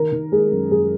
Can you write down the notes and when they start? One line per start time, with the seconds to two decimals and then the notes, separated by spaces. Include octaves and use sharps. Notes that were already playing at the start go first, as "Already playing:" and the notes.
Already playing: D#3 A#4
0.12 D#3
0.32 G#3 G#4
0.52 F#2
0.71 F#2 G#4